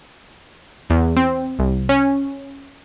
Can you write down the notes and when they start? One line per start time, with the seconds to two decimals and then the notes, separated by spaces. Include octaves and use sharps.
0.90 E2
1.16 C4
1.59 C2
1.89 C#4